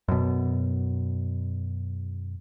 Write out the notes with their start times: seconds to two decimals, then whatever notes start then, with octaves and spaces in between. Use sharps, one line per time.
0.08 F#2 B2